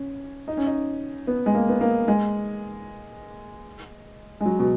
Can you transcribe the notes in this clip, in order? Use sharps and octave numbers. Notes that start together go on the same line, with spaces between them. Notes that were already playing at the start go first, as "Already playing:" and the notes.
Already playing: C#4
D#4
C#4
D#4
B3
G#3
A#3
B3
A#3
G#3
G#3
F#3
B2